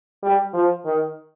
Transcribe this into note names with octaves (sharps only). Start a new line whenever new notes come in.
G3
F3
D#3